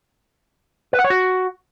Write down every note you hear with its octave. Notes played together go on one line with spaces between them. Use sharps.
B4
F#5
C#5
F#4